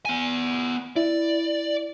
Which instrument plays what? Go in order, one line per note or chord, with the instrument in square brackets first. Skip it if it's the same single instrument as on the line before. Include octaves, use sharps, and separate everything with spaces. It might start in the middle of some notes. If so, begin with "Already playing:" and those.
[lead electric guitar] B3 G#5
[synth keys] E4 [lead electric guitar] D5